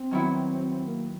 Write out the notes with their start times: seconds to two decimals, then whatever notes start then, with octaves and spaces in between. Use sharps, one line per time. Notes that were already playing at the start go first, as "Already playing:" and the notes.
Already playing: C4
0.11 D#3 F#3 B3 E4
0.85 A#3